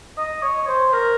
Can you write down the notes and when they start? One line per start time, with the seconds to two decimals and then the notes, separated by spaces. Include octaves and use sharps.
0.17 D#5
0.42 C#5
0.68 C5
0.93 A#4